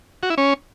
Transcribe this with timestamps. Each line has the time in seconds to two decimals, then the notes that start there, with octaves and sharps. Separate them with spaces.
0.23 F#4
0.30 E4
0.38 C#4